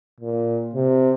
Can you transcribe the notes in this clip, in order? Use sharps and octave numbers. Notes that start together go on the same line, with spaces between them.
A#2
C3